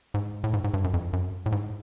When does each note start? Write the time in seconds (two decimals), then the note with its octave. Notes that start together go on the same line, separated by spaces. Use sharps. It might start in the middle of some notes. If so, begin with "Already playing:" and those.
0.14 G#2
0.44 A2
0.53 G#2
0.64 G#2
0.74 G2
0.84 F#2
0.94 F2
1.13 F#2
1.46 A2
1.52 G#2